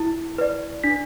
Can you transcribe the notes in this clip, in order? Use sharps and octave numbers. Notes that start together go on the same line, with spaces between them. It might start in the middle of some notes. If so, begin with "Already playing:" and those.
Already playing: E4
B4 D5
D4 B6